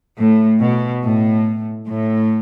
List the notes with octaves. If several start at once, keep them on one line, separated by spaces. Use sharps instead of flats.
A2
B2
A2
A2